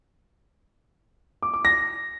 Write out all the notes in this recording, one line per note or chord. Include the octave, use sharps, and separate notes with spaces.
D6
D6
A#6